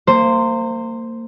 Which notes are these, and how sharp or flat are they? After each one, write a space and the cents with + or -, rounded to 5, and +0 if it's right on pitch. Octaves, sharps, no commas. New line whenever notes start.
A#3 -30 C5 +0